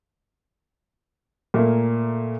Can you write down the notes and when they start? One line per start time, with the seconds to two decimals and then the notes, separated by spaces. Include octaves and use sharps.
1.54 A#2 A3 A#3